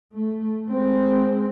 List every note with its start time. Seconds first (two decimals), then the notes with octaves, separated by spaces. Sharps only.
0.13 A3
0.68 G#3 C4